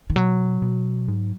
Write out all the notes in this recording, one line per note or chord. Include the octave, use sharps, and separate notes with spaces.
D#3
B2 F#3
B2
G#2